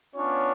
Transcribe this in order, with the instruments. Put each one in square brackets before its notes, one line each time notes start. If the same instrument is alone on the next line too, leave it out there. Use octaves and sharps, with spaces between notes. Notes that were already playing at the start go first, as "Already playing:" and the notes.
[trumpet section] B3 C#4 D4 F4 C#5